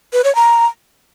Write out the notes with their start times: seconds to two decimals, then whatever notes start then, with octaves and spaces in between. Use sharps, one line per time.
0.13 B4
0.24 C#5
0.35 A#5